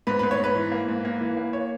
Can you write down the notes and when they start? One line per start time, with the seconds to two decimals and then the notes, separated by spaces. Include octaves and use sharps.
0.07 G#2 B4
0.19 G#2 B4
0.31 C#5
0.40 G#2 B4
0.55 E3
0.72 A#3
0.88 G#2
1.05 A#3
1.21 E3
1.37 A#3
1.53 C#5